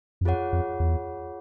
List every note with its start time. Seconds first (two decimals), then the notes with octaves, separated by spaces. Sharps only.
0.21 F#2
0.25 F2 F4 G#4 C#5 F#5
0.53 F2
0.80 E2